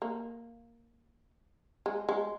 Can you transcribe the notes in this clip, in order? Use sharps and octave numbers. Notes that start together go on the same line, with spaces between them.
A#3
G#3
G#3